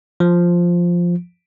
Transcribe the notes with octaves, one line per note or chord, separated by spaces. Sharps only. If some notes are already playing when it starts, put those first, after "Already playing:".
F3